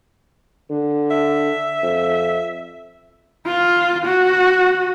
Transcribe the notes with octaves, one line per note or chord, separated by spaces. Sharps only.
D3
E5
F2
F4
F#4